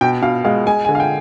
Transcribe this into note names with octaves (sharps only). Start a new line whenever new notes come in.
B2 G5
B2 F5
G#3 F5
G#3 G#5
G#5
D3
F5
G5